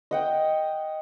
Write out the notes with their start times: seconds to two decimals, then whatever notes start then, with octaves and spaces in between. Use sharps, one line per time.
0.11 D#5 F#5 G5